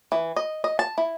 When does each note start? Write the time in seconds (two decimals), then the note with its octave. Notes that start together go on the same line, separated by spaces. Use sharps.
0.12 E3
0.36 D#5
0.64 D#5
0.79 A5
0.98 E4